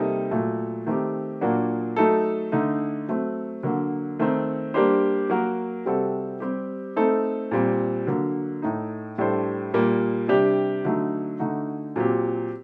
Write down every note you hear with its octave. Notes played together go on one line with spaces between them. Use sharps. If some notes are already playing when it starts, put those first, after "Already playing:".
Already playing: C3 G3 A#3 D#4 A4
A#2 F#3 A3
D#3 A3 C4 G4
A#2 F#3 A#3 D4 F#4
F#3 A3 D#4 A4
D3 A3 D#4
F#3 A3 C4
D3 F#3 A#3 F#4
D#3 A3 C4
G3 A#3 D4 G4 C5
F#3 A#3 F#4 A#4
C3 G3 C4 F#4 A4
G3 C4 G4
A3 C4 D#4 A4
A#2 G3 C4
D3 F#3 A#3
A2 A3 D#4
A2 G3 D4 A4 C5
A#2 G3 A#3
C3 G3 D4 G4
D3 F#3 A3 D#4
D3 A3 D#4 F#4
A#2 F#3 C4 G4